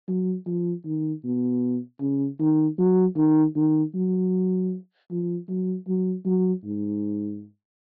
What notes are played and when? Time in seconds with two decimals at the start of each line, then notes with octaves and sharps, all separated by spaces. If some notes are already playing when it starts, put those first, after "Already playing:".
0.08 F#3
0.46 F3
0.85 D#3
1.24 B2
2.01 C#3
2.40 D#3
2.79 F#3
3.17 D#3
3.56 D#3
3.94 F#3
5.11 F3
5.49 F#3
5.88 F#3
6.26 F#3
6.65 G#2